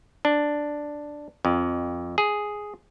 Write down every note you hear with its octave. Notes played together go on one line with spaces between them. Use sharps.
D4
F2
G#4